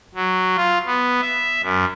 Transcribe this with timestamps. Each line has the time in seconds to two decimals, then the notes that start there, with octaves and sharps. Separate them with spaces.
0.15 F#3
0.57 F4
0.86 B3
1.22 E5
1.63 F#2